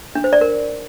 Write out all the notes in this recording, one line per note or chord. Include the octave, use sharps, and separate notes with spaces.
D4
C5
D5
A#4